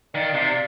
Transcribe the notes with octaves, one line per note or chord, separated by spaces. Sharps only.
D#3 D5 F5
C3 D5 F5